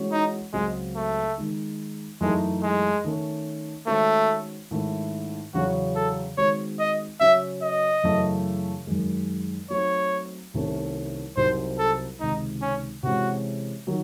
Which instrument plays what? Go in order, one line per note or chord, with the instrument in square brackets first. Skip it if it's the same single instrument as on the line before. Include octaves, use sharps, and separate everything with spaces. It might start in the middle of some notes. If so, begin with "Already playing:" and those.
Already playing: [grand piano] E3 G#3 C#4 F#4 C#5
[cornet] D#4
[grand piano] C#2 C#3 F#3 C4 [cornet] G#3
[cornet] A3
[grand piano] D#3 G#3 D#4
[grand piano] F#2 E3 A3 D#4 [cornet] G#3
[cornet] G#3
[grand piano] D#3 A3 C#4
[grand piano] D#3 G#3 C#4 F#4 C5 [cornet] A3
[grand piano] G#2 D#3 A3 C#4 E4
[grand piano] E2 C#3 F#3 C#4 [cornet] F#4
[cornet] A4
[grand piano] D#3 G#3 C4 F#4 [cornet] C#5
[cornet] D#5
[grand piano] C#3 F#3 C#4 F#4 [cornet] E5
[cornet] D#5
[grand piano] F#2 C#3 E3 A3
F#2 D#3 G#3
[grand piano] F#3 A3 C4 D#4 [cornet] C#5
[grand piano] C2 C3 D#3 A3 C#4
[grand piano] C2 C3 F#3 C4 D#4 [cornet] C5
[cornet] A4
[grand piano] C#2 C3 D#3 G#3 [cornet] D#4
[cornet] C#4
[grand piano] C3 E3 G#3 C#4 [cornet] F#4
[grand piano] D#3 F#3